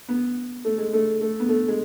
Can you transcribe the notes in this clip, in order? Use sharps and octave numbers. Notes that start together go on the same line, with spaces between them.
B3
A3
G#3
A3
A3
B3
A3
G#3